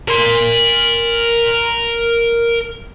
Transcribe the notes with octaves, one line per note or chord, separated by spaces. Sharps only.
A#4 C6